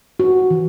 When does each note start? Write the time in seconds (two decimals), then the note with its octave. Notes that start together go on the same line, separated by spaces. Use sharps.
0.19 F#4
0.50 E3